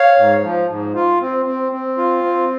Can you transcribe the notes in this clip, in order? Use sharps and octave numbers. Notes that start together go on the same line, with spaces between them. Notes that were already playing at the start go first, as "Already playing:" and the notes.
Already playing: C#5 F5
G#2
F3
G#2
F4
C4
C4
C4
F4
C4